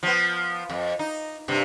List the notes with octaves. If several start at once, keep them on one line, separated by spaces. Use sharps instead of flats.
F3 B3
F2
D#4
G2 C3